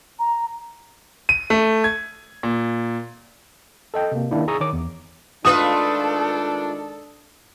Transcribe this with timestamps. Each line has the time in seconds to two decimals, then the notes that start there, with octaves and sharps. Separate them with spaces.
0.19 A#5
1.29 D#7
1.50 A3
1.84 G#6
2.43 A#2
3.94 A4 D#5 G5
4.12 C3 A#3
4.31 D#3 A#3 D4 E4
4.48 G#4 A#5 C#6 D#6 E6
4.61 D#3 C#5 D6
4.73 E2
5.45 D#3 G#3 A3 D4 F4 A4 B4 D#6